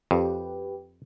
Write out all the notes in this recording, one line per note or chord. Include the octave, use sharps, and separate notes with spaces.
F2 G4 B4